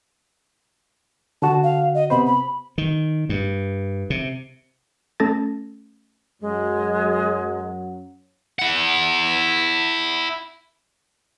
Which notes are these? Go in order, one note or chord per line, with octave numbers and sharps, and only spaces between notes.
D3 F#4 F#5 A5
F5
D#5
C3 B3 C5 B5
B5
D#3
G2
C3
A3 C#4 A4 A5 A6 A#6
F#2 F#3 G#3
E4 F#5